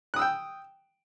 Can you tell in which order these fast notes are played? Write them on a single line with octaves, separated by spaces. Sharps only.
F#6 D#6 E6 G5